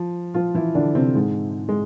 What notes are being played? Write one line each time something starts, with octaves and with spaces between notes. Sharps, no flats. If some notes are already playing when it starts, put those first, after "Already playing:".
Already playing: F3
F3 F4
E3 E4
D3 D4
C3 C4
G#2 G#3
G#3